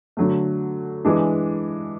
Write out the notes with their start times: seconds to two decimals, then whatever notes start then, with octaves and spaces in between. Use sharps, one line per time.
0.17 D3 F#3 A3
1.05 E3 G#3 D4